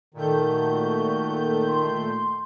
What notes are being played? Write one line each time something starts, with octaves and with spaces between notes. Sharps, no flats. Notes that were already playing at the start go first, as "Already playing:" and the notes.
A#2 D#3 A3 G6
F#4
C6